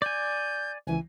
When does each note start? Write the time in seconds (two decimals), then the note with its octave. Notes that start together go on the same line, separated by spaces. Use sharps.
0.02 D5 G#5 G6
0.87 C#2 E3 G#5